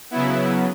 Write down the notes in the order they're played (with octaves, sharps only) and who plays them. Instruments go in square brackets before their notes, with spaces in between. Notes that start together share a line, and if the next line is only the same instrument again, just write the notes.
[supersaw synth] C#3 F#3 B3 E4